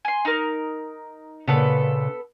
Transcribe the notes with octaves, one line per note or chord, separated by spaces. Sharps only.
G#5 C6
D#4 A#4
A#2 C#3 B3 A4 B4